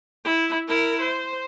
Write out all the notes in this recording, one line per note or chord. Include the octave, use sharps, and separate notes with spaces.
E4
E4 A#4
C5